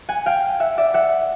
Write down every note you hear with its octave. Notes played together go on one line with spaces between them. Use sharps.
F#5 G#5
F5 G5
E5 F#5
D5 E5
E5 F#5